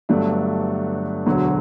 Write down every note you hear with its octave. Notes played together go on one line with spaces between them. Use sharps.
G1 G2 F#3 A3 D4
E1 D2 D3 F#3